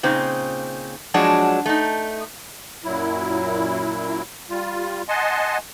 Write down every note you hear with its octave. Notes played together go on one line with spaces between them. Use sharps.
A#2 C#3 C4 D#4
F3 F#3 G#3 D4 F#4
A3 D#4
F#2 A#2 F#3 E4
G3 F4
D#5 F#5 G#5 A5 C6